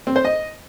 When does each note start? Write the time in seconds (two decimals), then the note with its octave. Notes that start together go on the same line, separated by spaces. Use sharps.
0.07 C4
0.16 C5
0.25 D#5